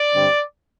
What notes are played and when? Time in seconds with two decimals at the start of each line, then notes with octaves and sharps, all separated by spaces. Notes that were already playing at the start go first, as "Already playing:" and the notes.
Already playing: D5
0.14 G2 D3 G3 C4